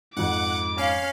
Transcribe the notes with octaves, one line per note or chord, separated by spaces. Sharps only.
F2 G#2 F#5 D6
C#4 F5